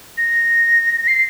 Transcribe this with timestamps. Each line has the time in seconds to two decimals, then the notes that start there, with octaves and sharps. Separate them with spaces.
0.17 A#6
1.08 C7